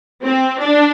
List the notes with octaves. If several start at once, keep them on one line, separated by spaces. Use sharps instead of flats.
C4
D4